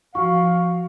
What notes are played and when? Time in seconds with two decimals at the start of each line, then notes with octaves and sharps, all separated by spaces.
0.15 F3 F#4 F5 C#6